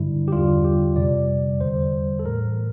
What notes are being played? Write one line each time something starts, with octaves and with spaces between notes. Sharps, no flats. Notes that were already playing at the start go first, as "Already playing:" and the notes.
Already playing: G2 D3 G3 E4
G4
E2 D3 G3 F4
G4
F2 C3 G3 D5
E2 D3 G3 C5
A4
A2 E3 A3 A#4